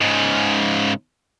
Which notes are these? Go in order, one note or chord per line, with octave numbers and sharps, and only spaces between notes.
G#2 C#3